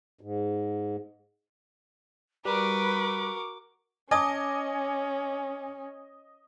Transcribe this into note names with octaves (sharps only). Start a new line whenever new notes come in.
G#2
G3 F#4 A#4 B4 D6
C#4 D#5 G#5 A5 D6 D#6